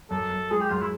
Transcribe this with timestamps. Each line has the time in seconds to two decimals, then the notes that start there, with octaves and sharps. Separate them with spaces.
0.10 F#2 A4
0.30 F#2
0.51 G#3 G#4
0.61 G4
0.70 F#2 F4
0.81 E4